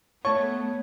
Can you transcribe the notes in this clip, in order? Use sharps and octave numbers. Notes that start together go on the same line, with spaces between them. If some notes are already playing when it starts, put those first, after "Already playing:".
A3 B3 C#5 A5 C#6